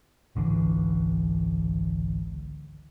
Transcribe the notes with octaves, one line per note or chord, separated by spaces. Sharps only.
G#1 C#2 D3 E3